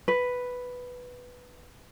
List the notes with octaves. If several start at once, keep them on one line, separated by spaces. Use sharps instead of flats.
B4